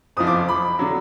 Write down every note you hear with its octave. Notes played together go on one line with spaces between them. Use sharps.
F#1 F2 F3 D#6
D6
D6
B5
D3 F#3